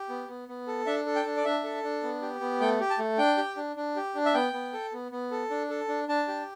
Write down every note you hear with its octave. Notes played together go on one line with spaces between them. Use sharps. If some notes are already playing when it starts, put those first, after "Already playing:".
Already playing: G4
B3
B3
B3
A4
D4 E5
A4
G5
D4
D5
D4 E5
A4
D4
B3
G4
B3
A3 G5
G4
A5
A3
D4 G5
G4
D4
D4
G4
D4
E5
B3 G5
B3
A4
B3
B3
A4
D4
A4
D4
D4 A5
G4